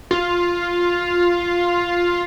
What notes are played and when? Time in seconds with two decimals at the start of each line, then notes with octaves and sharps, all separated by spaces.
0.11 F4